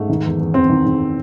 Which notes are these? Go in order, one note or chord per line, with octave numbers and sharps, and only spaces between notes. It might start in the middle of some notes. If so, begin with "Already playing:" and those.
Already playing: G#2 A3
D#3
E2
E2
E2 C4
D#3
D#3